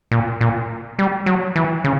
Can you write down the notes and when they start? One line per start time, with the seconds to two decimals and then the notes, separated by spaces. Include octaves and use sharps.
0.11 A#2
0.41 A#2
0.99 G3
1.26 F#3
1.56 E3
1.84 C#3